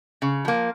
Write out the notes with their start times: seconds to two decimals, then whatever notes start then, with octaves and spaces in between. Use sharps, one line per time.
0.22 C#3
0.45 F3 A#3